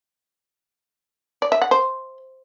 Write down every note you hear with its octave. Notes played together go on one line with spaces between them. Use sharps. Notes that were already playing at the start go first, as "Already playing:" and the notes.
D5
E5
F#5
C5